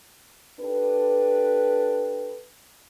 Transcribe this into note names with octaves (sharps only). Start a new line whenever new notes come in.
D4 G4 A4 B4